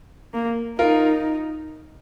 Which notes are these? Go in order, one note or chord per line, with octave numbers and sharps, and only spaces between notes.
A#3
D#4 F4 A#4